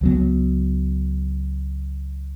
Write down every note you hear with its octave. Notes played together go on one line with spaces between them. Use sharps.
C#2 F#3 B3